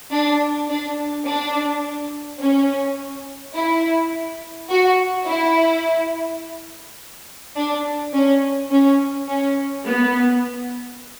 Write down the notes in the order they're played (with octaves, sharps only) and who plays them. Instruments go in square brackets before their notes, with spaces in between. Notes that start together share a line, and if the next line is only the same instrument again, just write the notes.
[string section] D4
D4
D4
C#4
E4
F#4
E4
D4
C#4
C#4
C#4
B3